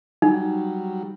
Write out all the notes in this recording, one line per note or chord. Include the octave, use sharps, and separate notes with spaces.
F#3 G3 D#4